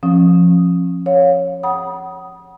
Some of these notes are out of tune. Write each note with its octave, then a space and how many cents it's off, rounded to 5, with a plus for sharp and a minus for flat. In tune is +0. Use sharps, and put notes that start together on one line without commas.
F3 +0 C#4 -30 D#6 +0
C#5 +0 F5 +25
F#5 +30 B5 -35 D#6 +5